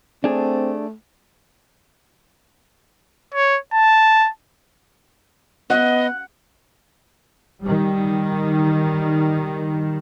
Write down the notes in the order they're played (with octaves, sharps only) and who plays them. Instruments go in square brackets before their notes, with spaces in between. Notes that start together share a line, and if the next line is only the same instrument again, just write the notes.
[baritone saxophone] A3 [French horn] C4 [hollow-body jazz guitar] D4 G#4
[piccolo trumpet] C#5
A5
[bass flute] B3 [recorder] D#5 [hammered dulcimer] F#5
[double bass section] D#3 G3